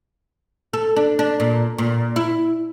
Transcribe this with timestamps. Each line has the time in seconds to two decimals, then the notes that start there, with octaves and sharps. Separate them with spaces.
0.73 A4
0.96 D4
1.19 D4
1.40 A#2
1.78 A#2
2.16 E4